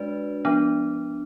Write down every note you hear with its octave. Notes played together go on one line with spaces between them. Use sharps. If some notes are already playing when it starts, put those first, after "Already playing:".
Already playing: G#3 D4 F#4 B4 D5
F3 B3 D4